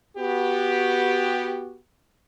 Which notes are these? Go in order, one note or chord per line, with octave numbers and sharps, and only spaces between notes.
B3 F#4 G4